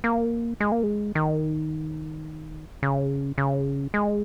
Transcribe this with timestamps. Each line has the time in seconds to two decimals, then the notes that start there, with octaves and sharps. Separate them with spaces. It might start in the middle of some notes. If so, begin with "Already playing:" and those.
0.04 A#3
0.60 G#3
0.72 A#3
0.83 G#3
1.15 D#3
2.83 C#3
3.38 C#3
3.94 G#3